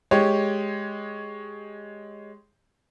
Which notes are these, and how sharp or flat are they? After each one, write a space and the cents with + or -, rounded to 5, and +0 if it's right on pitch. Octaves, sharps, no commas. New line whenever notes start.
G#3 +5 G4 +0 C#5 +0